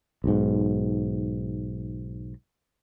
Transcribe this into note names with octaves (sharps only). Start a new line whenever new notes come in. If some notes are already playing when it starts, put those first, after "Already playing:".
B1 G#2